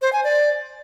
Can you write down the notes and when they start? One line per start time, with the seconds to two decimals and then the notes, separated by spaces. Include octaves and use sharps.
0.02 C5
0.13 G#5
0.24 D5